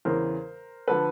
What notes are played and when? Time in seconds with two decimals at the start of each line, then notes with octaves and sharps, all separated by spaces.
0.05 E2 C#3 E3 A#4 C5
0.88 D3 F3 A4 B4